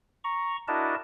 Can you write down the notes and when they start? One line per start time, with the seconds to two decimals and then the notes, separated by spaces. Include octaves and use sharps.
0.24 A#5 C#6
0.68 D4 E4 F#4 A#4 D#5 A5